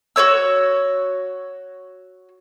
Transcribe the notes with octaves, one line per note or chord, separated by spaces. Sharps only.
F#4 B4 C#5 E6